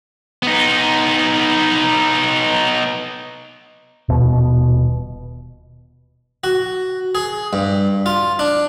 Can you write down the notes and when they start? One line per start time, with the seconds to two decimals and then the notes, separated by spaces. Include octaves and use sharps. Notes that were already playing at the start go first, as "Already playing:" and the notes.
0.43 B3 D#4
4.09 D#1 B2
6.44 F#4
7.15 G#4
7.53 G2
8.06 F4
8.39 D4